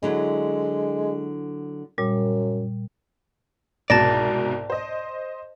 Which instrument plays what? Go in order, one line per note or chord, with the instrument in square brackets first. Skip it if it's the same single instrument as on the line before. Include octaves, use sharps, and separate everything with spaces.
[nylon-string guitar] D3 F#3 E4 [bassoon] G#3
[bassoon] F#2 [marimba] A#2 G3
[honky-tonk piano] C2 G#2 B2 [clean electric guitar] D5 [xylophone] A5 A6 A#6
[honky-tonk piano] C5 D#5